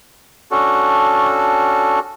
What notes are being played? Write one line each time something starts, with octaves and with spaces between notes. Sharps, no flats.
C#4 D4 F#4 A4